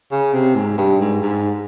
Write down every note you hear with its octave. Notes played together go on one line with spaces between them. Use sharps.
C#3
C3
G#2
G2
G#2
G#2